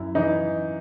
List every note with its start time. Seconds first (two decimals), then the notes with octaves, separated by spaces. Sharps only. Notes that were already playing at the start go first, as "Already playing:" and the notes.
Already playing: F#2 E4
0.15 E3 D#4